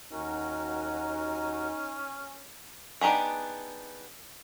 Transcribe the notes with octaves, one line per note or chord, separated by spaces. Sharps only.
D#2 C#4 D#4 F#4 A#4
B3 D4 D#4 G4 G#4